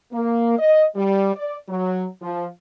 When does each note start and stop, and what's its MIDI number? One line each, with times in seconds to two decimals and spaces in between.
0.12 0.56 58
0.58 0.84 75
0.96 1.31 55
1.34 1.56 74
1.69 2.06 54
2.22 2.45 53